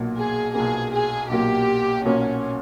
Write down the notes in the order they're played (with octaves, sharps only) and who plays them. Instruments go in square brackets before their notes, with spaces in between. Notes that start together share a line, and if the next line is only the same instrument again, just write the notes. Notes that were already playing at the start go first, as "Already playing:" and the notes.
Already playing: [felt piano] B1 A#2 F#3 A#3
[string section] G#4
[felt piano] B1 A#2 F#3 A#3 [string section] G#4
[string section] G#4
[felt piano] B1 A#2 F#3 A#3 [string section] G4
[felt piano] B1 A#2 F#3 A#3 [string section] C#4